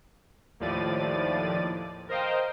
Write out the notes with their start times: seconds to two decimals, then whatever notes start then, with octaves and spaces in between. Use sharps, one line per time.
0.60 D#2 A2 F3 D5 A6 D#7
2.08 A#4 C5 D#5 F5 G5